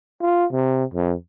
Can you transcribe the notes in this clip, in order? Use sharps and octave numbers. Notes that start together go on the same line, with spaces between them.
F4
C3
F2